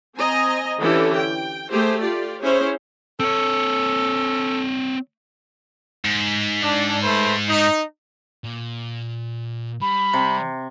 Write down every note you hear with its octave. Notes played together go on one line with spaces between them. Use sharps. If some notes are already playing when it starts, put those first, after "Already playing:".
C4 D#5 G#5 A#5
D3 E3 C#4 E4 G4 A4
G5
A3 G4 G#4 C5
F4 G4 D5
C#4 E4 G#4 C5 C#5
C4 A4 C#5
G#2
D4
A3 B4 C5
D#4
A#2
G3 B5
C3